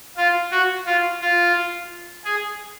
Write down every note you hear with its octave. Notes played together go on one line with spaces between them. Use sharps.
F4
F#4
F4
F4
G#4